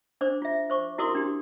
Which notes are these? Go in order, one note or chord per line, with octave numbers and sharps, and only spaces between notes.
D4 C5 D6
F4 E5
C5 C#6 D6
E4 F#4 A#4 C6 D6 D#6
D4 G4